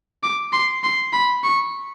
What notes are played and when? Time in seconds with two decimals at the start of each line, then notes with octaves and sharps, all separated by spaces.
0.23 D6
0.53 C6
0.83 C6
1.13 B5
1.44 C#6